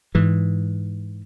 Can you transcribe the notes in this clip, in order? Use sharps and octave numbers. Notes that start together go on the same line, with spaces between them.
G#2 E3